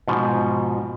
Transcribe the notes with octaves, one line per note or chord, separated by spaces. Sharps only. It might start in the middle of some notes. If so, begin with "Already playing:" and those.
G#2 B2 F3